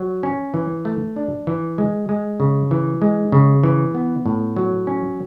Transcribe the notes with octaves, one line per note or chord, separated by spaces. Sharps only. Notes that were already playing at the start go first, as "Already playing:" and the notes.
Already playing: F#3
C#4
E3
A3
D4
E3
G#3
G#3
C#3
E3
G#3
C#3
E3
B3
A2
F#3
C#4